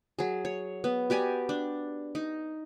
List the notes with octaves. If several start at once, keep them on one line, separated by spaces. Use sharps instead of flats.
F#3 G#4
C#5
B3
F#4 G4 D5 G#5
D4
D#4